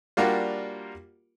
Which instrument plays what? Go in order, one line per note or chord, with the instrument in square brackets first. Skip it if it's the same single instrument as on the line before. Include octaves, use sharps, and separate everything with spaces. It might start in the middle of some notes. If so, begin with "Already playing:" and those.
[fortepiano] G3 A#3 D4 F4 F#4 A#4